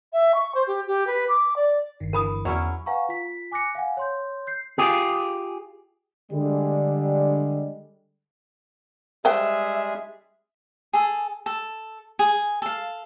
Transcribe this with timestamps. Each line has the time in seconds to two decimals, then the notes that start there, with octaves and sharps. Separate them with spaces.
0.13 E5
0.34 C#6
0.55 C5
0.67 G4
0.87 G4
1.07 B4
1.28 D6
1.56 D5
2.00 G1 G2 D#3 C7
2.13 D3 E3 A#4 B5 D#6
2.45 E2 F#3 C#4 E4 G#4 D5 F6
2.86 B4 F5 F#5 G#5 A#5 C#6
3.09 F4 B6
3.52 G#5 D6 F#6 A#6 C#7
3.75 F5 F#5 G#5
3.97 C#5 C6 G6
4.47 G6 C7
4.78 F4 G4 G#4
6.31 D3 G3 G#3
9.25 G3 G#3 G#4 B4 C5 E5 G5
10.93 G#4 A4
11.46 A4
12.19 G#4
12.62 A4 F5